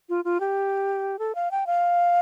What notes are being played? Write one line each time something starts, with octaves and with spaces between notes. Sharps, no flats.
F4
F4
G4
A4
F5
G5
F5